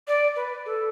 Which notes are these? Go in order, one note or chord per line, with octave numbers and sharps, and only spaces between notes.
D5
B4
A4